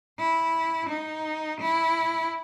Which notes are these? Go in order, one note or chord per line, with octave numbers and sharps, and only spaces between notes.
E4
D#4
E4